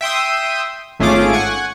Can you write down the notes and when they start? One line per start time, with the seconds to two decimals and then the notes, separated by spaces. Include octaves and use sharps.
0.01 E5 G5 C6 D#6
0.99 G#1 A3 C#4 F4 G#4 D6
1.33 F#5 G#5 C#6